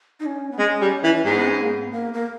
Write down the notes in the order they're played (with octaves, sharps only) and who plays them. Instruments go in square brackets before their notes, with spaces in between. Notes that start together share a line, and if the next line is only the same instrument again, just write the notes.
[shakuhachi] D#4
C#4
B3
[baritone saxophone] G#3 [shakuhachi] C#4
[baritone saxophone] G3
E3
[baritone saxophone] G#2 [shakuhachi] B3
[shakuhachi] C#4
A#3
B3
A#3
A#3